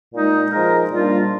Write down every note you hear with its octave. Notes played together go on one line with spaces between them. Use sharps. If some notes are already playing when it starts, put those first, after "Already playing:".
A#2 G#3 D#4
F3 G#3 D#4 A#4
A#2 G3 A#3 D4 F4